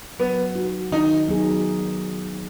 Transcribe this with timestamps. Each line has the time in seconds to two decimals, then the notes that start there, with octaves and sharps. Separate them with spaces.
0.19 F#3 B3
0.56 D#4 F#4
0.92 D#3 D#4
1.28 F#3 B3 D#4 G#4